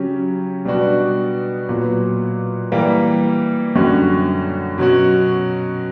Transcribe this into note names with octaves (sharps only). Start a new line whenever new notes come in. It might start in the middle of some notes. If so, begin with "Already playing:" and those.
Already playing: C#3 F#3 C#4 G4
B2 G3 B3 D4 F#4
A#2 F#3 B3
E3 G3 A#3
F#2 D3 G3 C#4 F#4
B2 F#3 C#4 F#4